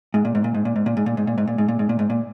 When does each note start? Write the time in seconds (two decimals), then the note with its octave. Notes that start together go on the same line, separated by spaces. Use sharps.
0.14 G#2
0.25 A#2
0.35 G#2
0.44 A#2
0.54 G#2
0.65 A#2
0.76 G#2
0.86 A#2
0.97 G#2
1.06 A#2
1.17 G#2
1.27 A#2
1.38 G#2
1.47 A#2
1.58 G#2
1.68 A#2
1.79 G#2
1.89 A#2
1.99 G#2
2.10 A#2